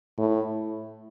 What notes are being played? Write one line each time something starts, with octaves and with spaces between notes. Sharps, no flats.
A2